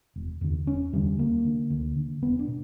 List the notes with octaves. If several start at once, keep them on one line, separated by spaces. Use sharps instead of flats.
E1
E2 D3
E1 C#4
E2 D3 G3
D2 A#3
D3
D2
D3
E1 B3
D4
B2